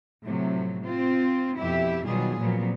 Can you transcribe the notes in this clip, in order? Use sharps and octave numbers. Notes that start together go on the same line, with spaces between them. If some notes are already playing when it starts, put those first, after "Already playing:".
A2 C3 F3 F#3
C4 F4
F2 B2 E4 G4 E5
B2 D#3 F#3 G3 F4 G#4
A#2 F3 F#3 B3 C4